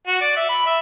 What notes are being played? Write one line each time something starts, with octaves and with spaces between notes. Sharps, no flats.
F#4
D5
E5
B5
E5